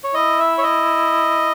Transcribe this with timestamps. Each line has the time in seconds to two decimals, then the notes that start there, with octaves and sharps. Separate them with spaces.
0.04 C#5
0.14 E4 D#5
0.39 E5
0.58 C#5
0.63 D#5